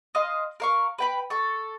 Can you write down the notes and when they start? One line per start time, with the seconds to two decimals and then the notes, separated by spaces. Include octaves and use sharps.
0.15 D#5 F5 C6
0.60 A#4 F5 C#6
0.98 B4 G5 B5
1.30 A4 C#6